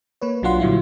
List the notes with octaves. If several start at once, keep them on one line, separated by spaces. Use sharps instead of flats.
A#3 B4 C#5
B1 F#3 D4 F4 F#5 C6
A#2 D3 F#3 G3 E4 F4